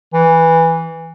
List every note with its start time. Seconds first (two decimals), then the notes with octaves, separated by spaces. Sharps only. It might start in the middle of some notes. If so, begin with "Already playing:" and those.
0.14 E3